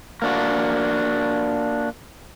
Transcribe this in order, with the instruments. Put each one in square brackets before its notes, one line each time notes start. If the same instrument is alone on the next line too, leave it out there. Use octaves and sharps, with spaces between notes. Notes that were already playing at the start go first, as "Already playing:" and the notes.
[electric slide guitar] A#3 D4 F#4